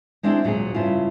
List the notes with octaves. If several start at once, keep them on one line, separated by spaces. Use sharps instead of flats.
G#3 C4 D4 E4 G5
D2 A#2 F#3 G4 G#4
G2 C#3 C#4 E4 F4